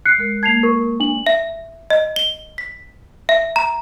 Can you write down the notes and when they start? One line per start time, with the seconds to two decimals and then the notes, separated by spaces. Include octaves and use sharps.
0.05 F#6 C7 C#7
0.18 G#3 A#4
0.43 A#3 A5 G#6 C7 F7
0.63 A#4 C#6
1.00 D4 F#7
1.27 E5
1.90 D#5
2.16 G7
2.58 B6
3.29 E5
3.56 A#5